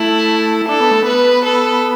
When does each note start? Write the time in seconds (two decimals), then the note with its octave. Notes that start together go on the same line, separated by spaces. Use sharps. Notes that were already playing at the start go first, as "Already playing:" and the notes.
Already playing: A3 E4
0.68 D4 A4
0.80 B3
0.91 A3
1.02 B3 B4
1.45 A4